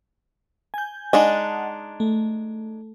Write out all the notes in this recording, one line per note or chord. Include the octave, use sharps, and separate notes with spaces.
G#5 G6
G#3 D4 D#4 D#5 F#5 A5
A3